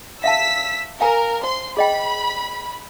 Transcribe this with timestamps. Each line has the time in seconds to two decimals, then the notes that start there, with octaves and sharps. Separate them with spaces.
0.24 E5 F5 A5 E6 B6
1.01 A#4 F5 G#5 A#5
1.44 C5 C6
1.77 G#4 D#5 G5 B5